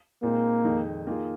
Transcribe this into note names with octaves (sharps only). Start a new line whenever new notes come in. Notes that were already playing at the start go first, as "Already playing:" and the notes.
A#2 G#3 A#3 C4 D#4
F2 D#3 G#3 D#4
D#3 A#3 F4 G#4